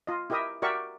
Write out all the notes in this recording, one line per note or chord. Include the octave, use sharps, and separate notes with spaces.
F4 D#5
E4 G4 A#4 D#5 E5 D#6
F#4 G4 A#4 D5 E5 C#6